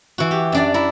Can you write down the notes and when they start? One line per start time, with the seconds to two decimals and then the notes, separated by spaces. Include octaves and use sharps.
0.18 E3 F#4
0.31 G4
0.52 F#2 D4 D5
0.74 E4 A#5